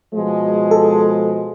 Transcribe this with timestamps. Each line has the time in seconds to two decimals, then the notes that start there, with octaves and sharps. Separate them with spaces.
0.15 B2 F3 G#3
0.71 A4